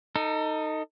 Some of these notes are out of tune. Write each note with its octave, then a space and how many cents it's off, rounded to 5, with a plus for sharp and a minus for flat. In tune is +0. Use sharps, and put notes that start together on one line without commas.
D#4 +0 A4 +30